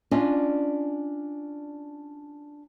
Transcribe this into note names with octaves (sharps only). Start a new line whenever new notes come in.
C#4 D4 F4 D5 D#5